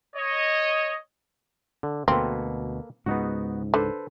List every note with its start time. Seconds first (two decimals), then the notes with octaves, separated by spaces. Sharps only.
0.16 C#5 D#5
1.83 D3
2.08 D2 B2 A#3 C4 A4 B4
3.06 C#2 G#2 B3 D#4 F#4
3.74 D3 A4 B4 C5